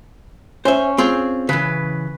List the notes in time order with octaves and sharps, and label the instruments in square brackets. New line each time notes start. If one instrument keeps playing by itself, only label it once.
[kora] C#4 [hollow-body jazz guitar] C5 E5
[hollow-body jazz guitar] C4 F4 G#4
[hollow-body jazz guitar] C#3 E3 [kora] B4